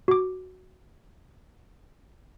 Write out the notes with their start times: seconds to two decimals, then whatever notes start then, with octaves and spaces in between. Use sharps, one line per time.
0.08 F#4 D6